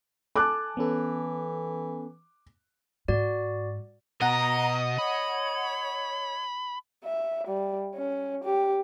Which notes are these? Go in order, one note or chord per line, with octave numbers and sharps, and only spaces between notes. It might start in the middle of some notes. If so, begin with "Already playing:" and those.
A4 G#5 A5 D6 F#6
E3 B3 C#4 A4
G#2 F#4 D5
B2 D#5 F#5 A#5
C#5 B5
E5
G3
C#4
G4